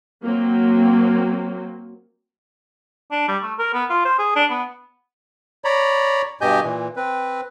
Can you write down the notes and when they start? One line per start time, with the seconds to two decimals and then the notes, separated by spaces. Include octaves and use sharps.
0.24 F#3 A#3 C4
3.11 D4
3.28 G3
3.43 A3
3.59 A#4
3.74 B3
3.90 F4
4.05 C5
4.19 G#4
4.36 D4
4.50 B3
5.65 C#5 D5 A#5 B5
6.41 G2 B2 G4 D#5 G#5 G6
6.63 A#2 E3
6.96 C4 B4